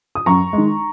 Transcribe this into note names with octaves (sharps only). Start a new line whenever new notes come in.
D#6
F#2 A#5 C#6
D#3 G#3